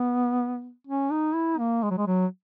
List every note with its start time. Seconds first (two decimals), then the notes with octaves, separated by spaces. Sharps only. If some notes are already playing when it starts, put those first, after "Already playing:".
Already playing: B3
0.87 C#4
1.11 D#4
1.34 E4
1.59 A#3
1.83 G#3
1.90 F#3
1.98 G#3
2.07 F#3